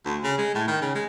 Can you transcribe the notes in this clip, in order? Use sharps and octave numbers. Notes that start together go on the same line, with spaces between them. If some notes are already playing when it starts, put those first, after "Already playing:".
D2
C#3
G#3
A2
D#3
C#3
G#3